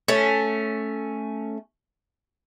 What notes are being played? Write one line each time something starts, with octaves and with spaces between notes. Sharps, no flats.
A3 C#4